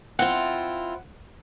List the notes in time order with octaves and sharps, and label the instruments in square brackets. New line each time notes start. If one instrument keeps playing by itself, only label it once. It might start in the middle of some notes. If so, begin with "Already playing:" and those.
[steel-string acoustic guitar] C4 E4 F4 [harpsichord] F#5